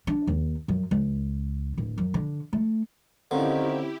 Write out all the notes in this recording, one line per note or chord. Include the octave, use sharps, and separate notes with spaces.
D4
D#2
F#2
C#2
D1
F#2
D3
A3
D3 D#3 F3 C4 C#4 E4 G4